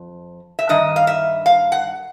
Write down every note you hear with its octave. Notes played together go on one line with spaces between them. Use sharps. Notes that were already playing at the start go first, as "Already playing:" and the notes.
Already playing: F2
E5
G2 D#3 D#5
F5
E5
F5
F#5